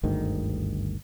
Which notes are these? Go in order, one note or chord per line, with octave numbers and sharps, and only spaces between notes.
G1 D2 G#2 D#3